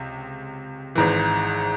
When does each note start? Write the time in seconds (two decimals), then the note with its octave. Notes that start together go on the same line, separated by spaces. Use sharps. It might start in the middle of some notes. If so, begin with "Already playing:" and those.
Already playing: C#2 C3
0.95 G#1 G#2 E3